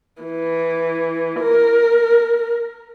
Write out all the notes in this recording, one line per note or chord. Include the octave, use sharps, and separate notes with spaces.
E3
A#4